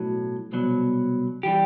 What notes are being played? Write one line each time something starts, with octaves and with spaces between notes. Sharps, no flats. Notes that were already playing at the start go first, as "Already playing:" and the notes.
Already playing: B1 A2 F#3
C2 B2 F#3
E3 G3 G4